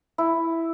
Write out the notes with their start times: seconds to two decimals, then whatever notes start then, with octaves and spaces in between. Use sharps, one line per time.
0.18 E4